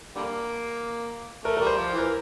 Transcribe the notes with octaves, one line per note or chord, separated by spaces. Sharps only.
D3 G3 A#3
A3 A#4
A#4
G3
C5
F3
E3
A#4